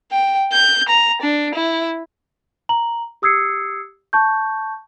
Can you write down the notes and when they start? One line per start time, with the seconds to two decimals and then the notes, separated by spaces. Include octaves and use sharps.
0.11 G5
0.52 G6
0.89 A#5
1.22 D4
1.55 E4
2.69 A#5 F#7
3.22 G4 D#6 E6 G#6 C7 C#7
4.13 A5 C#6 G6